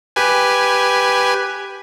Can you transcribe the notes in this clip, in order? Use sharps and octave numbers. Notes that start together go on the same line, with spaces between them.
G4 B4 G#5